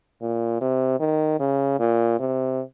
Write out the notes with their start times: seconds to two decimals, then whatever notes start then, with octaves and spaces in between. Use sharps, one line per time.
0.21 A#2
0.61 C3
1.00 D#3
1.40 C#3
1.79 A#2
2.19 C3